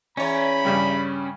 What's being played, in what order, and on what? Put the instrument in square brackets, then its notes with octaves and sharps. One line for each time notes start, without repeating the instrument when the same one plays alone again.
[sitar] E2 C#5 [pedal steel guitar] C#4 [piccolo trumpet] B5
[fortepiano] G2 C#3 G3